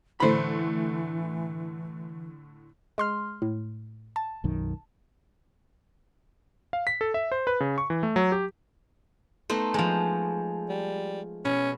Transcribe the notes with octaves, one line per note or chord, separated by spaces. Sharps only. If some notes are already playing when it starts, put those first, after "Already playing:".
A2 D3 E3 A3 C5 B5
G#3 C6 F6
A2
A5
B1 F#2 D#3
F5
B6
A4
E5
C5
B4
C#3
C#6
E3
A3
F#3
G4
A3 B3 D#4 C5
F3 G#3
G3
B2 C#4